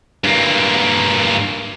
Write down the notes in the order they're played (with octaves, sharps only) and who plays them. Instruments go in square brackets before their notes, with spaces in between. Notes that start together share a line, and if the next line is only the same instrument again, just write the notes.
[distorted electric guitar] G2 A#3